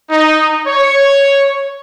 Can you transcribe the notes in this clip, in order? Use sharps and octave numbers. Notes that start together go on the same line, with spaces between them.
D#4
C#5